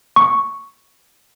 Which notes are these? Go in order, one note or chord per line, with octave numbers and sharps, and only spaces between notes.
C#6